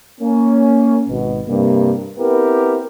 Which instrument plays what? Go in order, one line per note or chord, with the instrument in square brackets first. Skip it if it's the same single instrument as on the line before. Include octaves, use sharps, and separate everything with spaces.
[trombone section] A#3 C#4
G#1 B2
G2 C3 A#3
B3 C4 E4 G4 A#4 B4